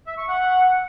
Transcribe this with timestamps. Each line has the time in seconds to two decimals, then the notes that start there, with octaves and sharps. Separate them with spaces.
0.07 E5
0.18 C#6
0.29 F#5